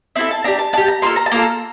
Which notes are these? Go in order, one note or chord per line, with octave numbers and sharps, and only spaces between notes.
C4 E4 A4 E5
A5
D4 G4 A#5
A5
D4 G4 A5
A#5
A#3 F4 A4 C6
A#5
A5
A#3 F4 A4 A#5